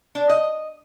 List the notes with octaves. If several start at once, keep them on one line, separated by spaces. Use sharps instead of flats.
D4
D#5